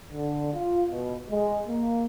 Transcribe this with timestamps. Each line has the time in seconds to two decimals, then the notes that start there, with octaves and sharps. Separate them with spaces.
0.11 D3
0.54 F4
0.89 B2
1.30 G#3
1.68 A#3